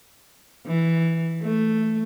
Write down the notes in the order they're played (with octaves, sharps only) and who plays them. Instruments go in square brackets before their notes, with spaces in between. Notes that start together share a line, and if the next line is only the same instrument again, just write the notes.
[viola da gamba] E3
A3